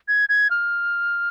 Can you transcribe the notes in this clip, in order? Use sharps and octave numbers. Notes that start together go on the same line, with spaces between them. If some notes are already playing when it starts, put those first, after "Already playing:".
G#6
G#6
F6